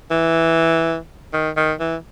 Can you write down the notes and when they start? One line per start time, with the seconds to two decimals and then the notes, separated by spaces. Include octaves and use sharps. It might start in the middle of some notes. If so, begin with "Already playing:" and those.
0.11 E3
1.33 D#3
1.57 D#3
1.80 E3